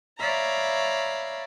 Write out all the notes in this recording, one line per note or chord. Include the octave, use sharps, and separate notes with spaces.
C#5 D5 E5 F5 A#5 B5